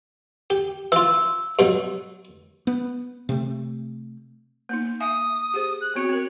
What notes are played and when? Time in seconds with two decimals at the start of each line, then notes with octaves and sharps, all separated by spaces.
0.50 G4
0.92 E3 F4 E6
1.59 G2 B2 F#3
2.67 B3
3.29 C3 A3
4.69 A#3 B3 D#4
5.01 E5 F5 G#5 D#6
5.54 G4 G#4 C5
5.81 F#6
5.95 B3 C4 F#4 C#5
6.09 C4 A#4